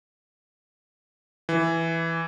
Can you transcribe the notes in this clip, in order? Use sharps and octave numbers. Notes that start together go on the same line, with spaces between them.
E3